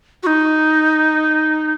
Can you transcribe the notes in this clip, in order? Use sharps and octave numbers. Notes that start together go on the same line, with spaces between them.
F#4
D#4